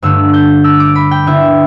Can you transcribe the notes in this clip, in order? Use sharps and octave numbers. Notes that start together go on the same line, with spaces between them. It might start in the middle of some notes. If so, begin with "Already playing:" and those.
G2 D3 A3 D4 E6
G6
E6
D6
B5
G5
D3 B3 E4 E5